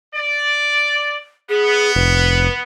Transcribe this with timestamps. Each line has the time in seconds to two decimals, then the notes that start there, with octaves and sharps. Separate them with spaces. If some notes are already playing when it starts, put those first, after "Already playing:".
0.14 D5
1.49 B3 G#4
1.95 F1 B4